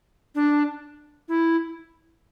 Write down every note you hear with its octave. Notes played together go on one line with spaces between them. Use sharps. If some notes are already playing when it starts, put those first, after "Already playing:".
D4
E4